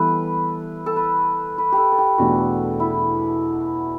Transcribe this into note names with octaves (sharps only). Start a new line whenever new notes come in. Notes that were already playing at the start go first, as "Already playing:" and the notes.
Already playing: E3 G3 B3 E4 G4 A4 B4
A4
B4
B4
G4
A4
A4
G4
E2 B2 A3 D4 F#4
E4